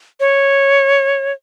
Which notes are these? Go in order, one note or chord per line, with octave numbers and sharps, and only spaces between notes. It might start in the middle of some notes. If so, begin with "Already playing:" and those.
C#5